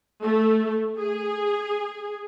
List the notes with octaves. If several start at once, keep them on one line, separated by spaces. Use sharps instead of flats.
A3
G#4